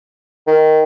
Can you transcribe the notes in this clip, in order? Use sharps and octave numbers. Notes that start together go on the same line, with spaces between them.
D#3